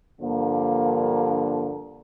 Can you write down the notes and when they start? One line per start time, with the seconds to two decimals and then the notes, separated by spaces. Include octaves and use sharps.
0.19 G2 D3 F3 A#3